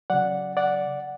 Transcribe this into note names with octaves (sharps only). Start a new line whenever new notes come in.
C#3 F#3 D5 F#5
D5 F#5